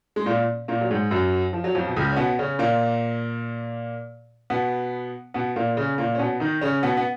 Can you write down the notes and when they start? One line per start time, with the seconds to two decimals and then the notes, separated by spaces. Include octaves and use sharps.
0.16 G#3
0.26 A#2 A#3
0.68 A#2 A#3
0.81 F#3
0.90 G#2 G#3
1.11 F#2 F#3
1.53 F3
1.64 F#3
1.75 F2 F3
1.87 B2
1.96 C#2 C#3
2.13 C#4
2.17 B2 B3
2.39 C#3 C#4
2.59 A#2 A#3
4.50 B2 B3
5.34 B2 B3
5.56 A#2 A#3
5.77 C#3 C#4
5.98 A#2 A#3
6.15 C#4
6.19 B2 B3
6.40 D#3 D#4
6.61 C#3 C#4
6.83 B2 B3
6.97 B3